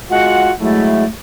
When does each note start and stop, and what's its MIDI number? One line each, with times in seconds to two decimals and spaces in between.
0.10 0.51 56
0.10 0.51 65
0.10 0.51 66
0.10 0.51 78
0.60 1.05 54
0.60 1.05 56
0.60 1.05 57
0.60 1.05 64